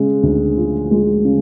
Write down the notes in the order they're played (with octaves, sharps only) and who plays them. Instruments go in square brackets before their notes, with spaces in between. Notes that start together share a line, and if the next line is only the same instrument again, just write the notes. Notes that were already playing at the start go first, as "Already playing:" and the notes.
Already playing: [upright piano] C#3 G#3
D2
F3
G#3
C#3